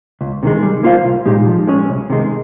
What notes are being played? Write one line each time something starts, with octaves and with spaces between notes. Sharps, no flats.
C#2
C3 D#3 G#3
G3
A#3 F4 C5 F5
C2
A#2 G#3 D#4 G4
F3
G#3 C#4 G#4 C#5
C2
C3 D#3 G#3